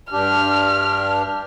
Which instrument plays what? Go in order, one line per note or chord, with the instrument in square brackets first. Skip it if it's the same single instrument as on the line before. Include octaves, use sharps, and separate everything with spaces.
[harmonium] G2 D4 G4 [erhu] F6